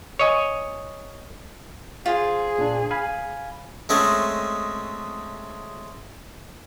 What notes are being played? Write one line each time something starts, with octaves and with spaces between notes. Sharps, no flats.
C#5 D#5 G#5
F4 G#4 C5
A#2 D4
F5 G#5 B5
G#3 A3 C4 C#4 D#5